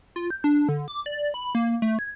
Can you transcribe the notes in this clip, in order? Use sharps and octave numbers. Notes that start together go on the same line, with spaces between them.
F4
G6
D4
D3
D6
D5
B5
A#3
A3
G#6